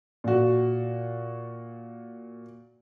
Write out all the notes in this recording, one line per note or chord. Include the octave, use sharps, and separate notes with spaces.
A#2 F#4